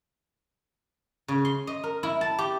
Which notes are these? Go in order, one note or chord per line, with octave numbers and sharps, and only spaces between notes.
C#3
C6
D#5
A#4
E4
A5
G4